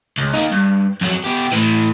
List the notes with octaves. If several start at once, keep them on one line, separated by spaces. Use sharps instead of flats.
C#2
A#3 D#4
G2
F2 F#3
B3 G4
A2 E3